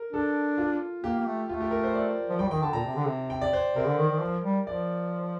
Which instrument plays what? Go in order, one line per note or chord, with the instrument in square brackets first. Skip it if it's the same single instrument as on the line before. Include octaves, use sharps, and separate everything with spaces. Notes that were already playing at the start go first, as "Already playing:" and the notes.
Already playing: [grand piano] A#4
[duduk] D4 [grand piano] A4
[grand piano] F4
[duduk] A#3 [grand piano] G4
[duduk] A#3
A3
[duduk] A3 [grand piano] F4
[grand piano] G4
A#4
C5
D5
[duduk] F3
[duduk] G3 [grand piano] G5
[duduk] D#3 [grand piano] G5
[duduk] D3 [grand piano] A5
[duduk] A#2 [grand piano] A#5
[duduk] C3
D3
C3
[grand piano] G5
D5
C5
[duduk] C3 [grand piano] A#4
[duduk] D3
D#3
D#3
F3
G3
[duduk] F3 [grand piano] D5